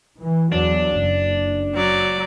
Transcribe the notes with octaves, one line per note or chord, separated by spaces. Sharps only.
E3
E2 F#3 D4
F#1
F#3 D5